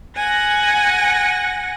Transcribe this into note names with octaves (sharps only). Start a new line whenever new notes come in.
F#5 G#5 A#6